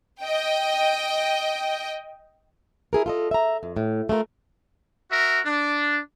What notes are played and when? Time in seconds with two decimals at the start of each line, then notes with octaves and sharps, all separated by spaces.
0.21 D#5 G5
2.93 E4 G#4 A#4
3.06 F4 A4 D#5
3.31 E5 A#5
3.63 F2
3.77 A2
4.09 A3 F4 G4 A#4
5.11 F#4 A#4 E5
5.45 D4